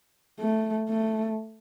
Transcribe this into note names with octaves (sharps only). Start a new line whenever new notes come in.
A3
A3